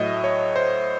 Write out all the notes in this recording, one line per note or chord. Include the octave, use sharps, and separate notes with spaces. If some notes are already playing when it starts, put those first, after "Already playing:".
Already playing: A2 F#3 A3 D#5 E5
C#5
C5